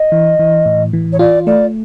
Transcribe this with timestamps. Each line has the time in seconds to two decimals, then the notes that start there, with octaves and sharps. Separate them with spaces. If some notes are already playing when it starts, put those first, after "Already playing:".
Already playing: D#5
0.12 E3
0.39 E3
0.66 A2
0.93 E3
1.12 C#5
1.19 F4 D5
1.46 A3 D5